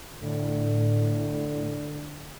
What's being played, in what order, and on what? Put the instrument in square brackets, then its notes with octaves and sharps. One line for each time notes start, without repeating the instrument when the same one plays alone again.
[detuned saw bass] A2 [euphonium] D3